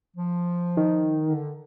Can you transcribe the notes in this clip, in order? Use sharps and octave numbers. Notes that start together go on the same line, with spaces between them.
F3
D#3
D3